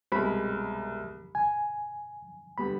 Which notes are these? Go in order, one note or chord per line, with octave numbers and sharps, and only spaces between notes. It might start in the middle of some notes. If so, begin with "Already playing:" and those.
C2 B2 G#3 B5
G#5
D3 G3 B3 B5